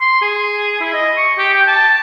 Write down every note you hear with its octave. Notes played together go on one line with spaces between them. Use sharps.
C6
G#4
E4
D#5
C#6
G4
G5
A5